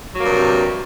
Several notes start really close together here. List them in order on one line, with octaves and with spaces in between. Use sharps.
F#3 A#3 G2 C3